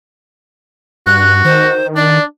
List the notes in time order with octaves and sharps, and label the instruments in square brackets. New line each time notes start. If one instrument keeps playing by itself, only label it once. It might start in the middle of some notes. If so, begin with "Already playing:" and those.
[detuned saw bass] G2 [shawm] F#4 [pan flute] F#6
[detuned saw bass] D#3 [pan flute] C5
[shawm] D4 [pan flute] D5